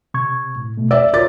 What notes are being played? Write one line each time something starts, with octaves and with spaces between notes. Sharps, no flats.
C3 C#6 G#6
A2
B2 A3
D5 E5 E6
F4 A#4 C#5 D6 A6